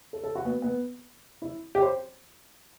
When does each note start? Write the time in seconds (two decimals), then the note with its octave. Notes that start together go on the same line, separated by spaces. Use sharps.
0.13 A4
0.23 A4
0.35 F#4
0.45 B3
0.62 B3
1.42 E4
1.75 G4
1.82 C5